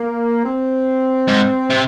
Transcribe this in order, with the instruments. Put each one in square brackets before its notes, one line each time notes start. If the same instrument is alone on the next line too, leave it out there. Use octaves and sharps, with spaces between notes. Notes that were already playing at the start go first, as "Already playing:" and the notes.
Already playing: [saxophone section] A#3
C4
[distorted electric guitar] G#2
C3